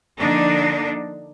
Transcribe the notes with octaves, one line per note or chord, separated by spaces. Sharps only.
D3 F3 A#3 D4 D#4